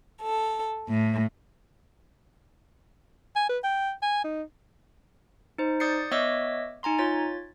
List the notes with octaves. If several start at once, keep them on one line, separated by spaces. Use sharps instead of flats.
A4
A2
G#5
B4
G5
G#5
D#4
D#4 C5
D5 D#6 G6 A6 C7 C#7
B3 C#5 D#5 E5 D6 E6
D#4 G#5 A#5 C6
F4 C#5 A6